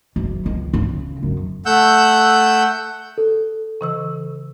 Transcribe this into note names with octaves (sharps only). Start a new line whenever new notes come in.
F#1
C#2
C#3
F#2
A3 F#5 E6 G6
A4
C#3 E3 E6